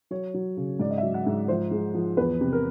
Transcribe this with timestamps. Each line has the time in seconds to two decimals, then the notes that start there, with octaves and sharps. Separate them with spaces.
0.11 F#3 C#5
0.34 F#3
0.57 C#3
0.79 G#2 D5
0.91 D#5
0.98 E5
1.03 F#3
1.14 F#5
1.27 G#2
1.48 F3 C5
1.71 G#3
1.94 F3
2.17 E2 B4
2.41 C3
2.53 A#4